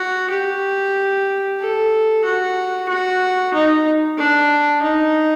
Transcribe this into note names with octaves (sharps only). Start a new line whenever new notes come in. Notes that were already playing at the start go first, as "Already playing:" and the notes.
Already playing: F#4
G4
A4
F#4
F#4
D#4
D4
D#4